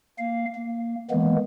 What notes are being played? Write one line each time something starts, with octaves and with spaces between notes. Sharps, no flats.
A#3 F5
A#3
D#3 E3 G#3 A#3 B3